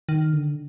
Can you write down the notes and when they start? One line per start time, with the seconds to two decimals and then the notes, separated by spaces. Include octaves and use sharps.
0.09 D#3
0.33 D3